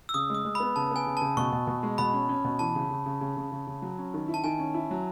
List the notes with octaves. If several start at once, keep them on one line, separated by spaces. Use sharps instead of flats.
E6
C#3 D#6
G#3 D#6
G#3
B3 B5
C#3 A5
B3 G#5
C#3
C#3 A5
B2 C#6
B2
B2
G#3
B2 B5
C#4
C#4
B2
E3 A5
C#3
C#3
C#3
C#3
C#3
C#3
C#3
F#3
C#4
D#3
E4
A5
D#3 G#5
C#4
E4
F#3